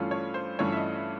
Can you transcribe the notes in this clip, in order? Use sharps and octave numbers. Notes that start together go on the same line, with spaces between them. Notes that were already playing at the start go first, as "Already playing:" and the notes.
Already playing: G2 E3 A3 C#4 F4
C#5
C5
G2 E3 A3 C#4 F4 C#5
E5
D#5
E5